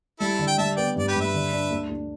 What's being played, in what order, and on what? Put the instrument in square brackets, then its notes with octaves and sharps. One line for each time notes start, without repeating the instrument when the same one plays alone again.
[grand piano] G3 [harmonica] E4 A4
[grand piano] D3
[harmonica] G5
[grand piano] G3 [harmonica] E5 A5
[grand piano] B3 [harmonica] D5 G5
[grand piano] G2 [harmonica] D5
[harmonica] G4 B4
[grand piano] G2
[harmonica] B4 E5
[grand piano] D3
D4
D2
D2